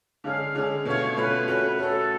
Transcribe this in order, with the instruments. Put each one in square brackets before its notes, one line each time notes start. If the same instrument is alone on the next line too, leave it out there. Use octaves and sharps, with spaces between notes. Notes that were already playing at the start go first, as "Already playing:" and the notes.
[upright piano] D3 G#3 C#4 G#4 [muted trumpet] F5
[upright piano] D3 G#3 C#4 G#4
[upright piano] B2 A3 C#4 F4 [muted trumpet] C#5
[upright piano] B2 A3 C#4 F4 [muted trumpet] B4
[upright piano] A3 C#4 F#4
[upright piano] A3 C#4 F#4 [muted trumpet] A4